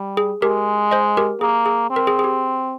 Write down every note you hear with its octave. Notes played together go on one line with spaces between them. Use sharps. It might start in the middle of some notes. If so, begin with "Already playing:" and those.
Already playing: G3
G#4
G#3 G4 A#4
C5 D#5
G4 A#4
A#3 G#4
G#4
C4
A#4
G#4
G#4
G4